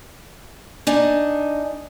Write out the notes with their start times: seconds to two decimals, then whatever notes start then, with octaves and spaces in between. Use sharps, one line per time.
0.87 D4 D#4 G#5